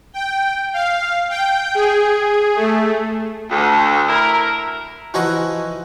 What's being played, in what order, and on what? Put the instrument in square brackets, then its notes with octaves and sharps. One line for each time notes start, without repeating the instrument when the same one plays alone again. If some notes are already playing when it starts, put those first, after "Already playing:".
[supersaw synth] G5
F5
G5
G#4
A3
[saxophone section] D2
E4 A#4
[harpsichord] E3 F3 D#4 E4 F#4 D#5